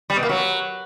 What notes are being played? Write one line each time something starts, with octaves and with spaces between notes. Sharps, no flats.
G3
B2
A#3
F#3